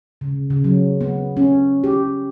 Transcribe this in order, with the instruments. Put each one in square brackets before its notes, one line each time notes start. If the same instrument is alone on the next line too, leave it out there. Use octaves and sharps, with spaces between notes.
[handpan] C#3
C#3
F#3
B3
C#4
G4